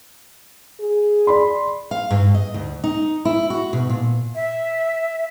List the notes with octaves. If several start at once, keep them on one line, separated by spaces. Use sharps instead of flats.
G#4
D5 B5 C6
F5
G2
D#5
D2
D#4
E4
F#4
B2
A#2
E5